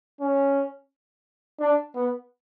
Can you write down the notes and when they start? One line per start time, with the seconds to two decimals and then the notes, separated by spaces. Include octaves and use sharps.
0.21 C#4
1.60 D4
1.95 B3